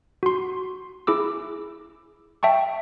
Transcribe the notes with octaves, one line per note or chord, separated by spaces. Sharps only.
F#4 C6
E4 G#4 D6 E6
E5 G5 A5 C#6